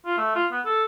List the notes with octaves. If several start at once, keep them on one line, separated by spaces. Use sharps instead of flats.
F4
A3
F4
B3
A4